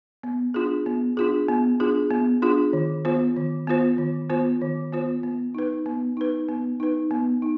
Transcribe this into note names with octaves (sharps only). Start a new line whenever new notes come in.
B3
D4 F4 G#4
B3
D4 F4 G#4
B3
D4 F4 G#4
B3
D4 F4 G#4
D#3
B3 F4 C5
D#3
B3 F4 C5
D#3
B3 F4 C5
D#3
B3 F4 C5
B3
D#4 B4
B3
D#4 B4
B3
D#4 B4
B3
D#4